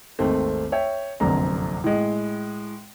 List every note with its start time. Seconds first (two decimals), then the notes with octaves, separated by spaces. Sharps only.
0.19 G#1 D#2 A3 C4
0.72 C#5 E5 G5
1.20 F1 A#1 F#2 D3 C4 A#5
1.84 A2 G#3